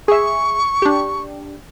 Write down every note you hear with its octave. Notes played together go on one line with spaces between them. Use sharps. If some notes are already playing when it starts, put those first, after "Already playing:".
G#4 E5 C#6
D4 G4